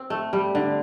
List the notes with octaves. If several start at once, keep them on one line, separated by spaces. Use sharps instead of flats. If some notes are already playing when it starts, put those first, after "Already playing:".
Already playing: C4
A3
G3
D3